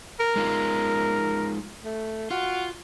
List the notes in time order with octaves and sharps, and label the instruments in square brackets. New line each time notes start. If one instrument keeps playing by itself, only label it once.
[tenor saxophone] A#4
[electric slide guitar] G#3 D#4 F4
[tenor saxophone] A3
[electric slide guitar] F4 [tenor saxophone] F#4